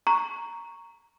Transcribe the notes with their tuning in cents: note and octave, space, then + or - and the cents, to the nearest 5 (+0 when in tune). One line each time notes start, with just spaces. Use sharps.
A#5 -5 C#6 +0